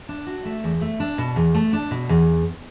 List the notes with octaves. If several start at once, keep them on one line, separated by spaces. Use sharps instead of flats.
D4
F#4
A3
E2
A3
D4
B2
E2
A3
D4
B2
E2